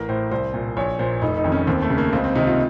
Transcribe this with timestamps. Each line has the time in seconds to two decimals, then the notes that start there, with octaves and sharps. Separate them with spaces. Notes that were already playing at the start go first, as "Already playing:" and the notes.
Already playing: A1 A#4
0.09 A2 C5
0.31 C2 C5
0.54 A#2
0.77 A#1 C#5
0.99 A#2 C5
1.22 F1 D#4
1.37 D#4
1.44 F2 D#3
1.52 C#4
1.67 D#2 C4
1.82 A3
1.90 C#3
1.98 A#3
2.13 C#2 C4
2.24 C4
2.35 C3 D#3 D#4
2.47 F4